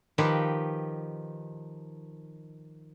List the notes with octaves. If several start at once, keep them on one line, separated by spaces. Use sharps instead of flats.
D#3 F3 D#4 G4 B4